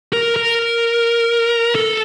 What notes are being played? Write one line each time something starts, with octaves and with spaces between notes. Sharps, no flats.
A#4
A#4
A4